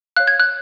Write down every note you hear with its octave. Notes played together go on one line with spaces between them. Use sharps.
C#5 F5 F#6
G#6
F#6